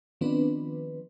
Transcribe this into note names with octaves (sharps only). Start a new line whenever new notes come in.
D#3 F3 B3 C4 D4 B4